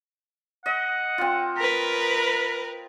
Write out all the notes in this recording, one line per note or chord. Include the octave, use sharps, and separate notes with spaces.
D#5 F#5
C4 F4
A#4 B4 B5